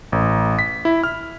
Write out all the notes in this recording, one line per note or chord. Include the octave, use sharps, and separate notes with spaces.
A1
B6
E4
F6